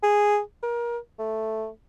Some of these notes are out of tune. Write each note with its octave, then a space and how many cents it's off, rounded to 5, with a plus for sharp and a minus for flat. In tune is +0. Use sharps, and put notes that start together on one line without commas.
G#4 -5
A#4 +25
A3 +0